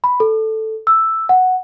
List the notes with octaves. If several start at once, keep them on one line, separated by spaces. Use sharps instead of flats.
B5
A4
E6
F#5